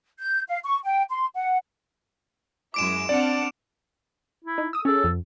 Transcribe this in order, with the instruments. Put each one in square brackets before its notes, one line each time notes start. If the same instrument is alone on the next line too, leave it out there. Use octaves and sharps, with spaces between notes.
[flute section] G6
F5
C#6
G5
C6
F#5
[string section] F#2 G#3 E4 [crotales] D6 D7 E7
[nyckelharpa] C4 D4 [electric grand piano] D5 [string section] F#5 A5 F6
[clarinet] E4
[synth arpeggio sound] D#4
D#6 E6
[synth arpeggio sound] C#4 G#4 [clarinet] A4
[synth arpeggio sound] F2